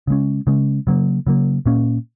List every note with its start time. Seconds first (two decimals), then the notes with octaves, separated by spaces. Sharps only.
0.07 C#3 G#3 C#4
0.47 C#3 G#3 C#4
0.87 C#3 F#3 A#3
1.27 C#3 F#3 A#3
1.66 A#2 A#3 C#4